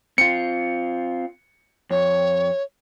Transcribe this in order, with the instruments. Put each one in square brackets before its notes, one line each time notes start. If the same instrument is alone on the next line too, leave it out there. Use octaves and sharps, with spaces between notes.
[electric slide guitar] C4 F4 [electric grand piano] C#7
[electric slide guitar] F2 [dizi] C#5